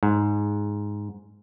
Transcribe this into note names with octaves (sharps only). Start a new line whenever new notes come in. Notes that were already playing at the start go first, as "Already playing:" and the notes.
G#2